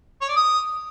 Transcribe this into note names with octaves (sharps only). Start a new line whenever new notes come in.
C#5
D5
D#6